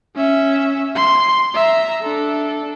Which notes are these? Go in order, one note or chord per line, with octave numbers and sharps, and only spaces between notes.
C#4 E5
C6
E5 A#5
D4 A4